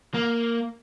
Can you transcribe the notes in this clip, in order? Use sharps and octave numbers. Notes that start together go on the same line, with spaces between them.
A#3